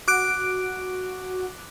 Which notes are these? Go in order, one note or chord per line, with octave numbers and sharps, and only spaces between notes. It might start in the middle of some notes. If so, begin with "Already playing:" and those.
F#4 D6 F#6 D7